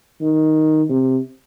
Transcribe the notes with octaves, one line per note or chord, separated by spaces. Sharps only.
D#3
C3